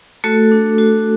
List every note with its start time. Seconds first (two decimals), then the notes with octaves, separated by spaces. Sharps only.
0.24 A3 F#4 A4
0.52 D4
0.78 F#4